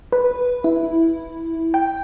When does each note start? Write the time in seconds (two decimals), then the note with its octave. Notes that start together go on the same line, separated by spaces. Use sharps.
0.12 B4
0.64 E4
1.74 G5